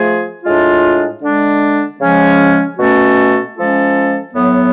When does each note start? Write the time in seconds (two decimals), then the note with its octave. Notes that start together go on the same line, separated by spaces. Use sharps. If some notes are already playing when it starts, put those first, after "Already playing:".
Already playing: F3 A3 F4 G#4
0.44 A2 G#3 D4 F4
1.22 D3 G#3 D4
2.00 C#3 F3 G#3 C#4
2.78 B2 A3 C#4 F#4 A4
3.57 F3 G#3 C#4 F4 A4
4.35 A2 F#3 B3